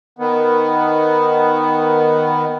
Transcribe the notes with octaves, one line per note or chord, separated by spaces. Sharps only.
D#3 B3